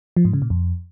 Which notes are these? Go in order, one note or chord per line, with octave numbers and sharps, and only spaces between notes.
F3
G#2
C#3
A#2
F2